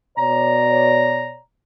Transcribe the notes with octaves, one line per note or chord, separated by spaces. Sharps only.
B2 C#5 D5 A#5